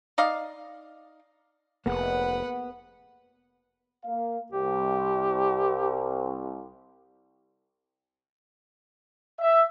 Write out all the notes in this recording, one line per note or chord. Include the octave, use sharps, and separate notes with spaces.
D#4 D5 D#5 F5
F1 A#3 B3 G#4 B4 F#5
A#3 F5
C2 G4
E5